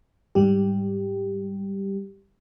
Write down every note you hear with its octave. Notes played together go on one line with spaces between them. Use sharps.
G#2 G3 G4